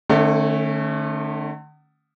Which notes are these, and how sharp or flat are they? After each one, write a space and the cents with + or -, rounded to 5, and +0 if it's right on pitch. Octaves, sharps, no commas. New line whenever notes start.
D3 +45 A3 +0 C#4 -25